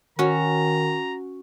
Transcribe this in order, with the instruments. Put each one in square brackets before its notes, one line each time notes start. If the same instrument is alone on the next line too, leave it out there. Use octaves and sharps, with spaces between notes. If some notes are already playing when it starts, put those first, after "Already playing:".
[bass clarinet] D#3 [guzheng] C#4 [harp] F#4 [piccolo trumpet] A#5